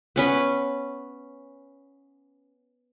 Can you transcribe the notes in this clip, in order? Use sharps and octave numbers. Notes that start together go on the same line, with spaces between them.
B3 C#4 B4